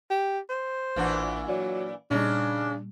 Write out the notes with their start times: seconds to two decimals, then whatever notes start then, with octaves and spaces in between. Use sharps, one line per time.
0.10 G4
0.50 C5
0.96 A1 A#2 E3 D4 F#5
1.48 F#3 D5
2.11 A#2 C#3 G3 D4 D#4